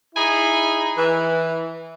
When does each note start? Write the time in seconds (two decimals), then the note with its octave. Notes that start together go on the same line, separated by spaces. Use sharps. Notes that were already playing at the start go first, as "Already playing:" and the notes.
0.15 D#4 E4 G#4 G#5 B5
0.97 E3